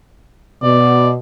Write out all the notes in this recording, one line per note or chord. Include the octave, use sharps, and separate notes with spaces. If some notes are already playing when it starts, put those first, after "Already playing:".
B2 D5